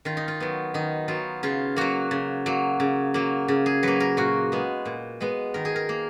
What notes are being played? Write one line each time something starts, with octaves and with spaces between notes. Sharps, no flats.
D#3 F4
D#4
F4
F#3 B3
D#3 D#4
F#3 B3 F4
C#3 F4
F#3 A#3 F#4
C#3
F#3 A#3
C#3
F#3 A#3
C#3
G#4
F#3 A#3 B4
A#4
A#2 F#4
G#3 B3
A#2
G#3 B3
D#3 A#4
G#4
A#4
A#3